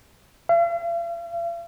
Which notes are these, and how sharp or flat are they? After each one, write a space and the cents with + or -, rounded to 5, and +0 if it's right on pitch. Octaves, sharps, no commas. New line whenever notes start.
F5 -45